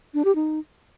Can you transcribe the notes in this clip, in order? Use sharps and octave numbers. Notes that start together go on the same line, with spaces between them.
D4
G4
D#4